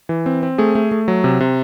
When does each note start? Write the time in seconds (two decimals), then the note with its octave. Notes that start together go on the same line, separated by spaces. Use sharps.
0.09 E3
0.26 C4
0.43 C4
0.58 A3 G#4
0.75 A3
0.92 A3
1.08 F#3
1.24 C3
1.40 C3